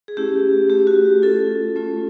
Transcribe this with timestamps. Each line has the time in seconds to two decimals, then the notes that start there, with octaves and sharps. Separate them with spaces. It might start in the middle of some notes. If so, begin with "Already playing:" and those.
0.08 G#4
0.17 A3 C#4 E4 G4
0.69 A3 C#4 E4 G4
0.87 F#4
1.22 A3 C#4 F4 A4
1.76 A3 C#4 F4